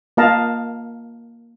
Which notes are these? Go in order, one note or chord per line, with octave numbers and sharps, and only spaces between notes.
A#3 F4 D#5 F5 A5 A#5